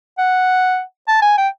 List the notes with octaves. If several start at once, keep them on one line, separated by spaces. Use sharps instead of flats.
F#5
A5
G#5
G5